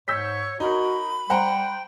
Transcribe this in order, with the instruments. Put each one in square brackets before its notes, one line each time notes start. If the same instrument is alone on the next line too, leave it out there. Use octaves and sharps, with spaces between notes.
[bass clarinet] G#2 [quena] C#5 [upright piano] E6 G6 B6
[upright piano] D#4 A#4 [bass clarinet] F#4 [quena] B5
[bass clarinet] G3 [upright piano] C5 F#5 A#5 [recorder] G5